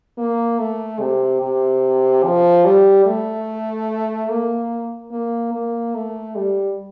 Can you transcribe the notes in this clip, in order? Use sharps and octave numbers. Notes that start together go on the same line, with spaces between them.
A#3
A3
C3
C3
F3
G3
A3
A#3
A#3
A#3
A3
G3